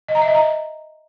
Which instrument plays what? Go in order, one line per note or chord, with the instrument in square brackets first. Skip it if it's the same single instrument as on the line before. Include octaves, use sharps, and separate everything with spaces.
[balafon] D#5
A#5
E5
D#5
A#5